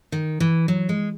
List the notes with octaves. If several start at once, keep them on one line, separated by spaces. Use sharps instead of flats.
D#3
E3
F#3
G#3